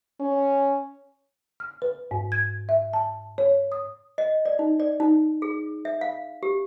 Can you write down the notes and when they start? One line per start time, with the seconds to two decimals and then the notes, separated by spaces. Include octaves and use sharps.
0.20 C#4
1.60 F6
1.82 B4
2.11 G#2
2.32 G#6
2.69 E5
2.93 A5
3.38 C#5
3.72 D#6
4.18 D#5
4.45 D5
4.59 D#4
4.80 D5
5.00 D#4
5.42 G#4
5.85 E5
6.01 F5
6.43 G4